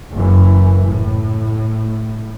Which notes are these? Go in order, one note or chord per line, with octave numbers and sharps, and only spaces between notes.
F#1 F#2 E3
A2